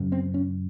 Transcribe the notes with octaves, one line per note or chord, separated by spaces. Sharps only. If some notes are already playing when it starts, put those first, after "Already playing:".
Already playing: F#2 C#3
C4
C#4